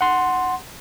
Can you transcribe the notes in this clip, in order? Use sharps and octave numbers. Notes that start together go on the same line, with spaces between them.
F#5 C6